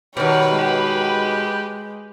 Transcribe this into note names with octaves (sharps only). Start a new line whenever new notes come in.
B2 D#3 G3 B4 C#5 B5
G#3 G4